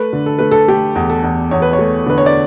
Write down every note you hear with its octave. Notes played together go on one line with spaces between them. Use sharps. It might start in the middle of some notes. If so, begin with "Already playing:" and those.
Already playing: A3 B4
D3
A4
A3 B4
A4
A3 G4
E2
A4
E2
E2 C#5
B4
C#5
A3
D3 B4
C#5
D5